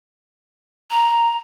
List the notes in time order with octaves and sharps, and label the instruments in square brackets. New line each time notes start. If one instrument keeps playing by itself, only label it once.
[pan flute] A#5